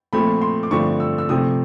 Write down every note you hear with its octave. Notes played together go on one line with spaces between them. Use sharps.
A#2 F3 A3 C4 B5
C6
D6
G2 D3 F3 A3 C4 C#6
E6
E6
C3 F3 A3 C4 D#6